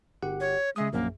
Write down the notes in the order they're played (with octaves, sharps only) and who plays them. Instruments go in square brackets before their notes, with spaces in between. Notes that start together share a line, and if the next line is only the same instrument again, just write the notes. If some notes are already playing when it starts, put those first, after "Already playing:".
[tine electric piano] G1 G4 F#5
[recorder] C#5
[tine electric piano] C#3 E5 D#6 [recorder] G#3
[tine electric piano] A#1 F#2 [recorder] A#3